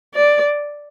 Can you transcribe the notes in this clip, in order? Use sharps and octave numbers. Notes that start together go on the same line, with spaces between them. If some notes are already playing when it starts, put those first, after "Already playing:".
D5